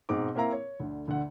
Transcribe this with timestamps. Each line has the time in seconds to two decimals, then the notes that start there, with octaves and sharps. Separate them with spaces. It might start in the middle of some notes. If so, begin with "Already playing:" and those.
0.09 G#2 B2 C4 D#4 D6
0.35 A#3 C4 E4 A#4 F5 A#5
0.52 C#5
0.80 D2 D3
1.08 D2 D3 A4 F#5